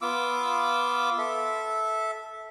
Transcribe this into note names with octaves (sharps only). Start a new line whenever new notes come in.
B3 F4 D6 E6
A4 E5